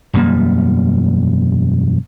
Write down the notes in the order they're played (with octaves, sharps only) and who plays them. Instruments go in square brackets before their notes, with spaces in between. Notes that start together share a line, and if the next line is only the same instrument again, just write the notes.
[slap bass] E1 F#2 G3 A#3